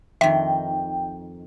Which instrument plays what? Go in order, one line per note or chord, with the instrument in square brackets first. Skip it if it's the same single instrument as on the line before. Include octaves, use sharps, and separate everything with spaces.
[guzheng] F2 D#3 [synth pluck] E5 [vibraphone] G5